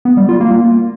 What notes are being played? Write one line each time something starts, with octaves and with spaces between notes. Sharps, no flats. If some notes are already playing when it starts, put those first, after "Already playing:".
B3
G3
F4
A#3